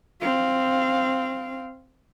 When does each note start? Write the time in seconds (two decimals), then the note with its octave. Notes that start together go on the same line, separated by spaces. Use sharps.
0.22 C4 F5